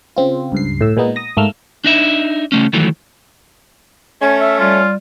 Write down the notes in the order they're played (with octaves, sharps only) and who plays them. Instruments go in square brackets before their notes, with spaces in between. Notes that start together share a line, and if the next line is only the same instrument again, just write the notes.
[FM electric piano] C#3 C4 F4
C#2 G2 C7
A2 E6
A#2 G#3 B3 D#4
D#6 A#6
G#2 A3 A#3 E6 F6
[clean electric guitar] D4 D#4 E5
C#3 A3 C#4
D#3 E3 F#3 A3
[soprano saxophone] A3 [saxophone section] C#4 [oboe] G#5
[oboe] E5
[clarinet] G3 [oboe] F4